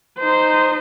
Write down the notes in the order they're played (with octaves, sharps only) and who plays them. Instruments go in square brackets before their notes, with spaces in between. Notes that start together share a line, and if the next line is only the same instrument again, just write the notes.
[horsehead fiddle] D#4 C5